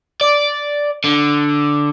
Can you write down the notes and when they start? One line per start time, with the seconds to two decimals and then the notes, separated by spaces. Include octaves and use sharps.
0.21 D5
1.05 D3